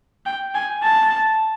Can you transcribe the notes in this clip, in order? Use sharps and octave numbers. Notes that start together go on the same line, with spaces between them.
G5
G#5
A5